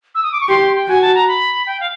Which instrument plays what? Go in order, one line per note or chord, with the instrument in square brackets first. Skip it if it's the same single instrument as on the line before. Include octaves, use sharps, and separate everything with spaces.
[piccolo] E6
D#6
D6
C#6
[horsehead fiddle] G4 [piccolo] C6
[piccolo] G5
[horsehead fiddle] F#4 [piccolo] G#5
[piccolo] A5
A#5
B5
G5
F5